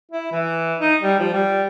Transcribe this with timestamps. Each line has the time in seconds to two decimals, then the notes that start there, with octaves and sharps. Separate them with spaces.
0.12 E4
0.32 E3
0.81 D#4
1.02 G3
1.19 F3
1.33 G3